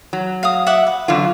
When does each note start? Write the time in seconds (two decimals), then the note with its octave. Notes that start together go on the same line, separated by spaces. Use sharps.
0.13 F#3
0.43 F5 D#6
0.67 E5 F#5 D6
0.87 B4
1.08 F#2 D3 F4